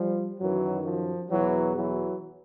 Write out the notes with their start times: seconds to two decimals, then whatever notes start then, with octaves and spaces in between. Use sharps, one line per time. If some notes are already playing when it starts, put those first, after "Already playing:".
Already playing: F3 G3
0.39 F#2 D#3 E3 F#3
0.85 F3
1.30 E2 B2 E3 F#3
1.76 E3 F#3